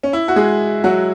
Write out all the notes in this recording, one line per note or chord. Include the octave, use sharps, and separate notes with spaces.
C#4
E4
F#4
G#3 G#4
F#3 F#4